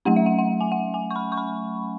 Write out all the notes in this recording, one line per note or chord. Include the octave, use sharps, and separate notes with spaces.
F#3 A3 C#4 F#5
E5
F#5
F#5
G#5
F#5
G#5
C#6
B5
C#6
B5